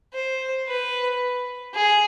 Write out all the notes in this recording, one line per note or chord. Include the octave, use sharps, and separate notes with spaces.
C5
B4
G#4